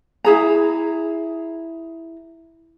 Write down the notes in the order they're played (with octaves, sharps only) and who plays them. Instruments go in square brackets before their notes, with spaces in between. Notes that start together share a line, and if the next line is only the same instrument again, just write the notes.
[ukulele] E4 G#4 A#5